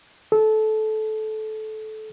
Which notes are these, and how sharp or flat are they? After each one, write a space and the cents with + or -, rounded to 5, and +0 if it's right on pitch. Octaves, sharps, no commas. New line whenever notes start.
A4 -20